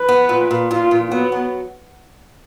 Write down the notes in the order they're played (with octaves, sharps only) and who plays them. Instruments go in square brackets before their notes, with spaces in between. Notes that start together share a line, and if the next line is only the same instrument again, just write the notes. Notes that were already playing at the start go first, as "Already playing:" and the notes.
Already playing: [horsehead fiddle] B4
[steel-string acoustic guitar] B3
A#2
A#2
[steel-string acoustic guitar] A#2 [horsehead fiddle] F4
[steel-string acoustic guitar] A#2
[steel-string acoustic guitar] F#3 [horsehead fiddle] B3
[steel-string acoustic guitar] F#3